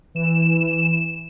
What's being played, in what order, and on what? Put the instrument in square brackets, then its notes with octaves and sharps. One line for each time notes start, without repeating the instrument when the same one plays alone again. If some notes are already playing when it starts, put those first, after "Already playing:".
[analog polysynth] E3 E7